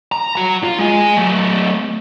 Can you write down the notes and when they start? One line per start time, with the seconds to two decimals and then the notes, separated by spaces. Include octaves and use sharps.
0.12 A#5
0.36 F#4 A#5
0.64 F4
0.79 G#3 G#5
1.17 F#3 A3